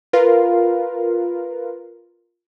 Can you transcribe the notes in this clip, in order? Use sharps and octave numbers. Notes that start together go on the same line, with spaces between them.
F4 A#4 B4 F5